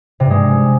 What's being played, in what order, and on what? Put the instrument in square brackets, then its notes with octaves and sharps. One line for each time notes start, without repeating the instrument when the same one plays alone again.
[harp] C3
G2
G#3